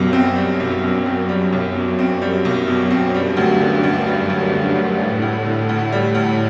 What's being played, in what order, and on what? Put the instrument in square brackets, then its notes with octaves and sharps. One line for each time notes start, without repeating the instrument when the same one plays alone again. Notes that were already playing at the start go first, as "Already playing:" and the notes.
Already playing: [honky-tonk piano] B1 B2 G3 [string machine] F#2
[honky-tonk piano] C4
G3
B1
B2
C4
G3
B1
B2
C4
G3
B1
B2
C4
[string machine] G2 [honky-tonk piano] G3
[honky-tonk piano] D2
D3
D2
G3
D2
D3
D2
[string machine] A2 [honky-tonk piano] G3
[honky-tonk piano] D2
D3
D2
G3
D2